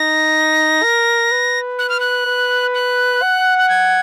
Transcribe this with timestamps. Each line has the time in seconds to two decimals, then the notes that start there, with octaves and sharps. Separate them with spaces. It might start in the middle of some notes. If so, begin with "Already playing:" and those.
Already playing: D#4 A#6
0.83 A#4
1.31 B4
1.79 F#6
1.89 F6
2.00 F#6
2.26 B4
2.74 F#6
3.22 F#5
3.58 F#6
3.69 G#6